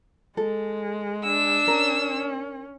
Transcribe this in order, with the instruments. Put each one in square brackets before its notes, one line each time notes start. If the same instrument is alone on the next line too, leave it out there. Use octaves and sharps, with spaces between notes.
[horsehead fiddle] G#3 [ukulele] A4
[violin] D4 E6
[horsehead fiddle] C#4 [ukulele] A#4